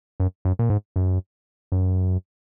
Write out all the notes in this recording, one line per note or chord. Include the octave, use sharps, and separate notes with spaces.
F#2
F#2
A#2
G#2
F#2
F#2